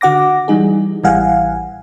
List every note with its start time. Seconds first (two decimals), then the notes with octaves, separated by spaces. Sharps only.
0.01 D3 F#4 F#5 D6 A#6
0.48 E3 G3 D#4 G#4
1.04 A1 E3 G3 F5 F#5 G#5